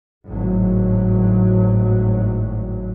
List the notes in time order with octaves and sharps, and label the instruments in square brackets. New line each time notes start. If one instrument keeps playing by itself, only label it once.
[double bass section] G#1 A2 F#3